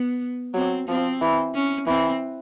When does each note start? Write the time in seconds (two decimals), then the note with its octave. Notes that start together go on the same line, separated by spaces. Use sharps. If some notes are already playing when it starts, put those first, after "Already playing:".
Already playing: B3
0.54 F#3 C4
0.88 F3 C4
1.22 E3
1.55 C#4
1.87 E3 C4